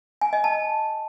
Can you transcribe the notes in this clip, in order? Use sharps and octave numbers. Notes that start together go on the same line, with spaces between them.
G#5
D#5
A5